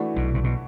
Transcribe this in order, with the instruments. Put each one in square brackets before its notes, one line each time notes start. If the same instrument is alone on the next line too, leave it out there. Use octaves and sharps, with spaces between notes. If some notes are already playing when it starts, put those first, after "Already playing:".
Already playing: [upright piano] E3 A3 D4 F#4
[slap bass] B1 B2
C3
B2